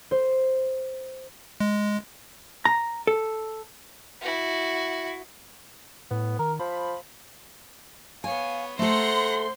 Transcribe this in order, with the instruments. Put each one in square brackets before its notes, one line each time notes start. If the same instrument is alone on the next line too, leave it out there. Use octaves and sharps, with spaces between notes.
[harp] C5
[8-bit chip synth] G#3
[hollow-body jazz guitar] A#5
A4
[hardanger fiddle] E4 F#4
[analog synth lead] A2 [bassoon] B3
[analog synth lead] D#3 [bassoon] A#4
[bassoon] F3 [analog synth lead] B5
[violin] B3 C#5 [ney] F5 [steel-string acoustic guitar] G#5
[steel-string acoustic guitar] A3 A4 [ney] C5 [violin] F#5 A#5 [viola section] C6